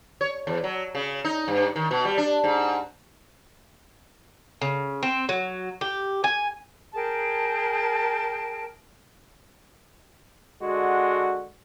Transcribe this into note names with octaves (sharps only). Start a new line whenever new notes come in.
C#5
E2
F#3
C#3
D#4
G2
D#3
B2
G3
D4
G#2
C#3
C4
F#3
G4
G#5
G#4 A#4 G5 A5
D3 G#3 F#4